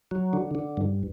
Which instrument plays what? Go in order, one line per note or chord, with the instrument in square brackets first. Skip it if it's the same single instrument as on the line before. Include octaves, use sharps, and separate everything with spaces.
[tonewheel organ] F#3
D3
D3
G2